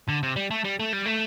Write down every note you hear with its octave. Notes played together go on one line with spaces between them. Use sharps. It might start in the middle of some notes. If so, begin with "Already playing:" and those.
D3
C3
G3
A3
G3
A3
G3
A3